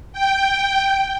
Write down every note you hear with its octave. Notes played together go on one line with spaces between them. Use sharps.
G5